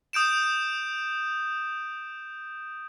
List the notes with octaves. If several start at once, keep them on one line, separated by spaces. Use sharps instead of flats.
D#6 G6 D7 E7